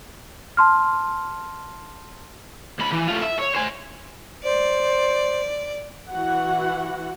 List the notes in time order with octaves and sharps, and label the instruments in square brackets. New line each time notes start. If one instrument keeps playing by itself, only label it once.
[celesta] A5 C6 F6
[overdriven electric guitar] C#2 B5
E3
A3 F4
E5
C#5
C5 G#5
[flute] C5 [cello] D5
[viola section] E3 F#4 F#5